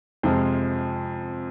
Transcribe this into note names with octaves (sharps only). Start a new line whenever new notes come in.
F2 C3 F3 G#3 C5